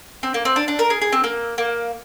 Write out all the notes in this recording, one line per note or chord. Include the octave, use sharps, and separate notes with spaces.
C4
A#3
C4
D4
D4
A#4
G#4
G#4
C4
A#3
A#3